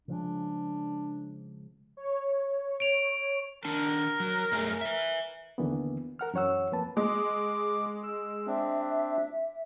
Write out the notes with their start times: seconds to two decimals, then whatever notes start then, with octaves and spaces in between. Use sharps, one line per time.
0.08 C#3 F3 G#3 D4
1.97 C#5
2.80 D7 F7
3.65 D#3 D4 A#4 A5
4.20 F#3
4.52 F#2 A3 G#4
4.81 B4 E5
5.58 D#2 D3 E3 A#3 B3
6.19 A#4 F#5 F6
6.34 F#2 E3 C#5 F#5 E6
6.72 F2 A#3 B4 A5
6.97 G#3 D6
8.04 E6
8.47 C4 D4 E5